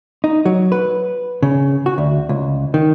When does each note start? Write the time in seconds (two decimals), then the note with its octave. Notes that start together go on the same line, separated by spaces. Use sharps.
0.24 D#4
0.45 F#3
0.72 B4
1.43 C#3
1.86 F#4
1.98 D2
2.29 C#2
2.74 D#3